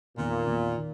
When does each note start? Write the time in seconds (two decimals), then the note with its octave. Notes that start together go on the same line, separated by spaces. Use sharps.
0.17 E2 A#2 D#3 A#3
0.46 E2 D#3 A#3
0.76 D#3